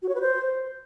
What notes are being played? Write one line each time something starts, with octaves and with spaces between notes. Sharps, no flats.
F#4
C#5
B4
C5